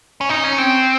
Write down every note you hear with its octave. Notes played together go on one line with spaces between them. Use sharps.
C#4
D#4
C#4
C4